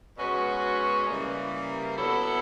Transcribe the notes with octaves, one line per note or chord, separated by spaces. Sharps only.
B2 G#3 C#4 F#4 B4
C#3 E3 G3 A#3
F#3 B3 E4 A4